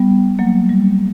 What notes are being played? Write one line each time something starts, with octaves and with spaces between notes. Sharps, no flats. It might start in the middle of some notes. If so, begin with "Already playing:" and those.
Already playing: G3 B3
F#3 A#3
G3